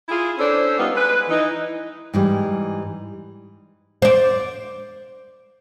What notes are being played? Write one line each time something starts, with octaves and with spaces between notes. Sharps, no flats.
E4 F4 G#4
C#4 D4 A4 C5
G3 B3 D#4 F4
G#3 B4
E3 D#4
G#2 E3 G3
C5 D5